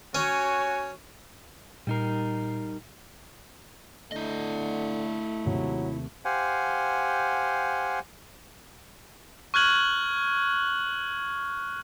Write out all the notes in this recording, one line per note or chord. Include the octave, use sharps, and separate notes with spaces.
C#4 F#4 C#5 G#5
A#2 G3 D#4 A#4 C7
D3 A3 E4 D#5
D#2 C3 F#3
G4 C5 F5 F#5 G#5
C#6 F6 F#6 G#6 F#7